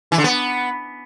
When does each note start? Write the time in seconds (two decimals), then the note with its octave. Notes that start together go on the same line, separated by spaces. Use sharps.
0.12 E3
0.18 D3
0.24 B3